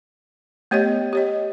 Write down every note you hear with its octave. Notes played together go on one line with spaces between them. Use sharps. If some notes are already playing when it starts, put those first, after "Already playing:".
A3 B3 G4 C#5 D#5 G5
G4 C#5 D#5